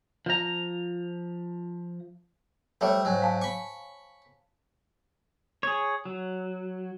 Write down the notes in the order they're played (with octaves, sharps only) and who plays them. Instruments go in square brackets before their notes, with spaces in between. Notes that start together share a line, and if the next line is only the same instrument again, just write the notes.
[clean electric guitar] F3 A#5
[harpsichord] G3 A3 [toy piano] C5 C#5 G5
[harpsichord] G#2 F#3
[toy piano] F5 G#5 A5
[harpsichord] B5 C#6
[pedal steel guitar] G#4 C#5
F#3